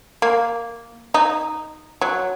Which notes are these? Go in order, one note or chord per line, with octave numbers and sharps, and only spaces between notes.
A#3
D#4
F#3